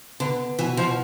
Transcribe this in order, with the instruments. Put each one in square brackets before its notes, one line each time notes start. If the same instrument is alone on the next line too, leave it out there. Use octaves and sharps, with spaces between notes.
[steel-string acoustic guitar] D3 [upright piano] B3
[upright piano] B2 [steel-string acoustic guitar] E3
[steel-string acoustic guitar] F3